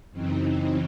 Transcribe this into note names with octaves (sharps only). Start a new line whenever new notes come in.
F#2 C#3 E3 C4 D#4